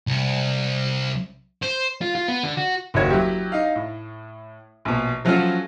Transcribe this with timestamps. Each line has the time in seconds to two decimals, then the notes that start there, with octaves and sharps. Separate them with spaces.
0.07 C2
1.63 C5
2.01 F4
2.15 F4
2.28 B3
2.43 D3
2.57 F#4
2.94 F#1 D#2 E4 F#4 C#5 G#6
3.10 F#3 E4 G4
3.52 D#4 F5
3.76 A2
4.85 A#1 B2
5.25 F3 F#3 A3 C#4 F4 F#4